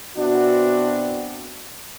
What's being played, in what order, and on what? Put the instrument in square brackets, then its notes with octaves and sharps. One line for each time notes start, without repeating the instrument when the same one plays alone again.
[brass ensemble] B2 C4 D4 E4 F#4